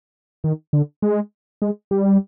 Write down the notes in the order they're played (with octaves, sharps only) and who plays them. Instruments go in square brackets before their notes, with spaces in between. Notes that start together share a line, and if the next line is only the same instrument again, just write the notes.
[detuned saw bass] D#3
D3
G#3
G#3
G3